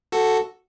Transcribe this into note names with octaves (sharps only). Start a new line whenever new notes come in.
F#4 A4